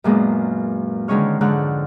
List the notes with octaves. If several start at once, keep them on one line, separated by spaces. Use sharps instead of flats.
F#2 A#2 G#3 B3 D4
D3 D#3 G#3 C#4 C#5 F6
F2 G#2 D3 C#5 F6 F#6